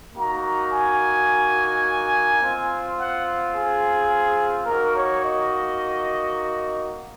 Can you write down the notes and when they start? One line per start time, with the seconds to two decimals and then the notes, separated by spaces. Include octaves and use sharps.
0.16 A#3 D#4 F#4 A#5
0.72 G#5
2.41 C4 F4
2.98 F#5
3.54 G#4
4.66 A#3 D#4 F#4 A#4
4.94 C#5
5.23 D#5